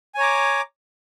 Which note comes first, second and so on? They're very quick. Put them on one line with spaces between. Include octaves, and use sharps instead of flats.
G#5 C#5 A#5 D6